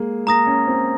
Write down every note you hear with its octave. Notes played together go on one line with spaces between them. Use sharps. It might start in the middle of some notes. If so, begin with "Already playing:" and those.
Already playing: G#3 A#3
A#3 A#5 D#6 A#6
C#4
C4